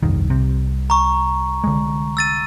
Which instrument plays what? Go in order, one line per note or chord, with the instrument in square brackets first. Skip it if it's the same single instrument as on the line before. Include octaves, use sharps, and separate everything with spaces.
[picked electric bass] G1 F2 D#3 [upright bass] C2
[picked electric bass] C3
[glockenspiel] A#5 C#6
[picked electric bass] D3 G#3
[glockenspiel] E6 A6 D#7